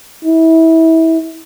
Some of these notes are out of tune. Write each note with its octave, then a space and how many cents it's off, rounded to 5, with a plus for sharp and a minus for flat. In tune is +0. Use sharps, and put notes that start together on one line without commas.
E4 -25